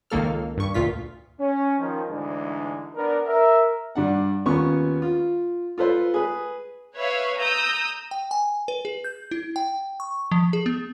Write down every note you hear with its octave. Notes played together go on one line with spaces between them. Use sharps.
C#2 D#3 A#3 A4 F6
G2 C#6
D2 A#2 F4 B6
C#4
D#3 F3
D2 G#2 E3 G#3 D4
B3 D4 A#4 D5
A#4 E5
G2 D4 F#5
D#2 B3 C#4 F4 C#6
F4
F4 A4 B4 C5
G#4 B4
B4 C#5 E5 F5
A#5 D#6 E6 G6
G5
G#5
B4
G#4
G6
E4
G5
C#6
F3
G#4
B3